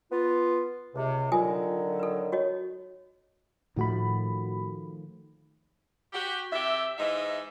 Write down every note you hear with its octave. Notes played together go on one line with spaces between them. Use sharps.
B3 F4
C#2 C3
D3 D#3 F#3 F4 G#5 D#6
A4 B4
F#4 C#5 D#5
A2 D#3 F3 A3 F#4 B5
F#4 G4
C3 G4 A4 E5
G#2 E3 D#4 D#5 E5